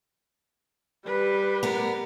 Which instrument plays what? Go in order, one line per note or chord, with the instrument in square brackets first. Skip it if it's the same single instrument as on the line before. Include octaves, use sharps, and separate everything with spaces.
[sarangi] G3 [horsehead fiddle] B4
[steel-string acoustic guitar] B3 A#4